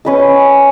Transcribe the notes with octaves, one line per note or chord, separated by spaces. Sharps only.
C#4 B4 D#5